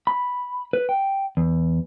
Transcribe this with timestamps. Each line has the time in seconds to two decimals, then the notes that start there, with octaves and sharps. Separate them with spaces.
0.07 B5
0.73 B4
0.89 G5
1.37 E2